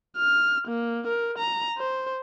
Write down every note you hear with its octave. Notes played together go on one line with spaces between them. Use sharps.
F6
A#3
A#4
A#5
C5